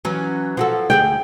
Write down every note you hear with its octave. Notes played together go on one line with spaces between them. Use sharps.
E3 F#3 C#4
F3 F#4 A4
D2 G4 G#4 G5